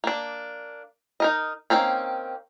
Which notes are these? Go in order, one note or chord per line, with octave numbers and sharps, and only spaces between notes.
A#3 D4
D#4 A#4 D#5
D#3 F#3 A#3 C4 C#4